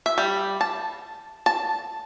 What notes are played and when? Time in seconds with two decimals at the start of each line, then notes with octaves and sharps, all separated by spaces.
0.06 E5
0.18 G3
0.61 A5
1.46 A5